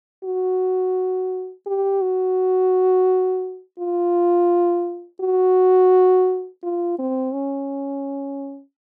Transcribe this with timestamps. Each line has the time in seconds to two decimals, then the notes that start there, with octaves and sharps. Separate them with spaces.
0.24 F#4
1.66 G4
2.02 F#4
3.79 F4
5.21 F#4
6.63 F4
6.99 C4
7.34 C#4